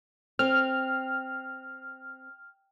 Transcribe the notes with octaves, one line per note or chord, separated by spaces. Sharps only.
C4 F6